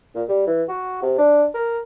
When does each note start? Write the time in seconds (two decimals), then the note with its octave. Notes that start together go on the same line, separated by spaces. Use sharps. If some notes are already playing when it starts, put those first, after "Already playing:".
0.15 A#2
0.29 G3
0.47 E3
0.69 F#4
1.02 C3
1.18 D4
1.54 A#4